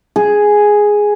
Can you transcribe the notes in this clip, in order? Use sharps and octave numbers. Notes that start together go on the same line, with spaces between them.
G#4